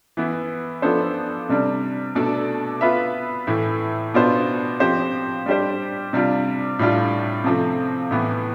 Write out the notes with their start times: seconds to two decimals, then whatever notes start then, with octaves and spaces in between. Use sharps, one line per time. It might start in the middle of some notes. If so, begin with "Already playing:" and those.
0.17 E3 B3 E4
0.82 F3 B3 D4 A4 C5
1.49 C3 G3 D4
2.15 B2 A3 D4 A4 D5
2.81 B3 F4 B4 E5
3.47 A2 E3 A3 E4
4.14 B2 B3 D4 F4 C5
4.80 F3 C4 G4 C5
5.46 G3 D4 G4 C5
6.13 C3 G3 D4 F4
6.79 A2 G3 D4 F4
7.44 C3 F3 A3 C4
8.11 A2 E3 B3